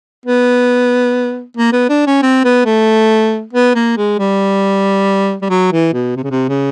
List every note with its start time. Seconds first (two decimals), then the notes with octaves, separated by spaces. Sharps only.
0.26 B3
1.57 A#3
1.73 B3
1.89 D4
2.07 C#4
2.23 C4
2.44 B3
2.65 A3
3.53 B3
3.75 A#3
3.97 G#3
4.19 G3
5.42 G3
5.50 F#3
5.72 E3
5.93 B2
6.16 C3
6.23 C#3
6.31 C3
6.49 C#3